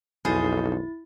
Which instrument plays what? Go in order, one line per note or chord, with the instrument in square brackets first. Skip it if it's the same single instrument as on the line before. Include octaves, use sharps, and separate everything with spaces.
[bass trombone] B1 [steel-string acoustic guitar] F2 D#4 A4 [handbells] E4 A6 [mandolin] G#4 C5